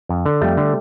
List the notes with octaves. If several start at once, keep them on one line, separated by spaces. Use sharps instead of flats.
F2
D3
F2 G3 A3
D3